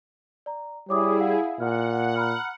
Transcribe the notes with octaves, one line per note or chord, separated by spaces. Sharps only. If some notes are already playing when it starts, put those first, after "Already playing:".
D5 A#5
G3 E4 G#4 C#5 D6 D#6
F5 F#5
A#2 F#5 F6
A#5 B5 F6